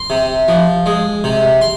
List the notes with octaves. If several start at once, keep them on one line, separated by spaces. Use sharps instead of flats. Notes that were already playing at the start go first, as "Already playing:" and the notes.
Already playing: C6
C3
F3
G#3
C3
C6